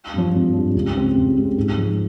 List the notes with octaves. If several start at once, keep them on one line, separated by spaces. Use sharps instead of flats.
G2 F3
G#1
G2 F3
C#2
C#3 G#3 C4 G4
C#2
C#3 G#3 C4 G4
G#2
F3 G#3 D#4